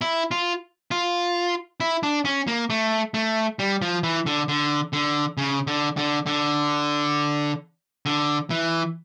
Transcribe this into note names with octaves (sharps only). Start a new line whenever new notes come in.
E4
F4
F4
E4
D4
C#4
A#3
A3
A3
G3
F3
E3
D3
D3
D3
C#3
D3
D3
D3
D3
E3